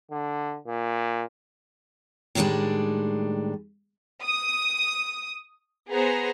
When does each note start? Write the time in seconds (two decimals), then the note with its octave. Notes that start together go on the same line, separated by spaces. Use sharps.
0.11 D3
0.67 A#2
2.35 A2 D#3 F3 G3 G#3 D4
4.23 D#6
5.89 B3 G#4 C5 A#5